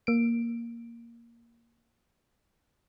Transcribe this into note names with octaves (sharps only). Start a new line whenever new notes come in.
A#3 D7